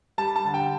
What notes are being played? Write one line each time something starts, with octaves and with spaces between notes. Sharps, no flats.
G3 A5
A5
D3
G5